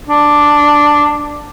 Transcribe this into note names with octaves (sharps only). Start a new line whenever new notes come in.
D4